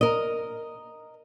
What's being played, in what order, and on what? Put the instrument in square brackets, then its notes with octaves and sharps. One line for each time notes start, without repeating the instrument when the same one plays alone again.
[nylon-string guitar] A#4 D#5